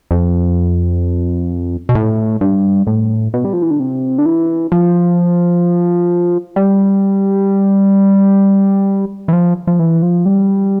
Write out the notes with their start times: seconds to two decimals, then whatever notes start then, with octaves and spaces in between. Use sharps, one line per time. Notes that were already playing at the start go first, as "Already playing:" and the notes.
0.11 F2
1.89 B2
1.95 A2
2.41 G2
2.87 A2
3.34 B2
3.45 G3
3.53 F3
3.62 E3
3.71 D3
3.80 C3
4.18 D3
4.26 E3
4.72 F3
6.56 G3
9.28 E3
9.33 F3
9.67 F3
9.79 E3
10.02 F3
10.26 G3